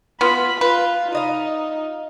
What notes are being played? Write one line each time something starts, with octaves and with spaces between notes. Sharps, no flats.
B3 F4 B5
F4 B4
D#4 F4 D#5 F5